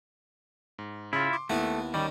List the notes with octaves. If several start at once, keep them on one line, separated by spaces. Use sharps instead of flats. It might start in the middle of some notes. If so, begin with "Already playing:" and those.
G#2
C#3 E4 F4
C6 D6
D#2 A3 B3 E4 F#5
D#3 G3 C#4